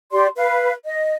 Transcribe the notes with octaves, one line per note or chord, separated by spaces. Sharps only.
G4 D5 C6
B4 F5
D#5